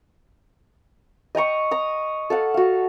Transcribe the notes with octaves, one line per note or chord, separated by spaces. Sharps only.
D#5 G5 A#5 C#6
A#5 D#6
A4 F5 F#5
F#4 F5